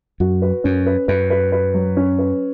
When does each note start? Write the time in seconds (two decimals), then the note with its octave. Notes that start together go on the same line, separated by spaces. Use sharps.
0.20 F#2 F#4
0.42 B4
0.64 F#2 C#4
0.86 B4
1.08 F#2 B4
1.30 B4
1.52 B4
1.74 F#3
1.97 C#4
2.19 B4